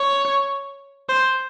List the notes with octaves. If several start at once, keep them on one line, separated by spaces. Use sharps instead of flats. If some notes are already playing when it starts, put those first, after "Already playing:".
Already playing: C#5
C5